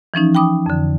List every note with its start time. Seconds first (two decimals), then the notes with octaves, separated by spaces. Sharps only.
0.14 E3 F3 C#4 D#4
0.35 G5 B5 D6 D#6
0.66 F2 D3